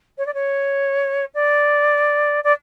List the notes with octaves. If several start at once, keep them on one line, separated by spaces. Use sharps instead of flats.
C#5
D5
C#5
D5
D5